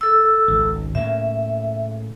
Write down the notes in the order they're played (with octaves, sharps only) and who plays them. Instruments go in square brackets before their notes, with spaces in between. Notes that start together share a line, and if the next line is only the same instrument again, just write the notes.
[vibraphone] A4 E6
[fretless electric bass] G#1 C#2
[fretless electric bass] A2 C#3 A#3 [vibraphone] E5